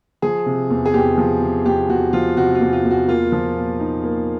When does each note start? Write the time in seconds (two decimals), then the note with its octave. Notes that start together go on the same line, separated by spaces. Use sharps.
0.22 F3 G#4
0.46 C3
0.70 E2
0.86 G#4
0.94 E2 G4
1.18 F3
1.41 C3
1.65 E2 G4
1.89 E2 F#4
2.13 F3 F4
2.37 C3 F#4
2.55 F4
2.61 E2
2.73 F4
2.85 E2
2.90 F#4
3.08 A#3 F4
3.32 F3
3.55 A#2
3.79 D#4
4.04 A#3